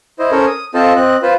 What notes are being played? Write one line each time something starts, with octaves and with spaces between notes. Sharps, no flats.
E4 C5 D#5
C#4 A4 A#4 C5 C#5
D#6
C4 F4 A4 C5 D#5 A5
C4 D#5 F#6
F4 B4 C5